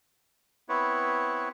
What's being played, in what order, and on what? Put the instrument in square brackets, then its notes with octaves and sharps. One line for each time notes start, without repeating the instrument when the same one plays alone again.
[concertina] B3 C4 E4 B4 C#5